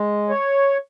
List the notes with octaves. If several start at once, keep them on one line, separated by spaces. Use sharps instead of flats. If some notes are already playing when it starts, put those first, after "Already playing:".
Already playing: G#3
C#5